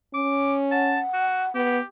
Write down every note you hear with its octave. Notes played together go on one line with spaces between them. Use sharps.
C#4 D6
F#5 A5
F#4
B3 G4